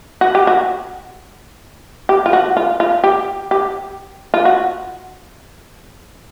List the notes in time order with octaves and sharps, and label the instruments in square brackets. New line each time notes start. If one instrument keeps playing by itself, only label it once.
[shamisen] F#4
G4
F#4
G4
F4
F#4
F4
F4
G4
G4
F4
F#4